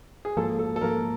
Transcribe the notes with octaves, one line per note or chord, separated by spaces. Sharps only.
G#4
G#2 F3 A#3 A4
A4
A4
G#2 F3 A#3 A#4